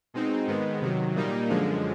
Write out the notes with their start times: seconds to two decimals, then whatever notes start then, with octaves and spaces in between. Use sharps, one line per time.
0.14 B2 G#3 C4 D#4
0.47 G#2 D#3 G#3 B3
0.81 C3 D#3 F#3
1.15 A#2 G3 A#3 D#4
1.50 F#2 D3 F3 G#3